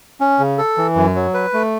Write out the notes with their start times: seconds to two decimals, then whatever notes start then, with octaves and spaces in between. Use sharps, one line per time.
0.21 C#4
0.39 C#3
0.58 A4
0.77 E3
0.96 F#2
1.15 F#3
1.34 B4
1.53 A3